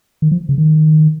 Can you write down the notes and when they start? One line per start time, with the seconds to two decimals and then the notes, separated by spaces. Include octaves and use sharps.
0.22 D#3
0.31 F3
0.49 C#3
0.58 D#3